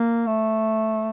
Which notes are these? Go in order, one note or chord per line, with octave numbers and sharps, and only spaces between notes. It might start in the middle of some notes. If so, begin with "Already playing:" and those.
Already playing: A#3
A3